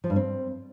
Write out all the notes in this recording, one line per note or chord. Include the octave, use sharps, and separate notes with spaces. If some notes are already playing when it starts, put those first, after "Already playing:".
F3
G2
C4